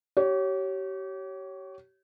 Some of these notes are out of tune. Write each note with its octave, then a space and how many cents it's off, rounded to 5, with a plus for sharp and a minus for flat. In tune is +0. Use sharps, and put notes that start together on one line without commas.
G4 -35 C#5 +0